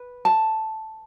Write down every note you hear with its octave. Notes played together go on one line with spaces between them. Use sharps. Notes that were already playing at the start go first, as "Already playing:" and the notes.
Already playing: B4
A5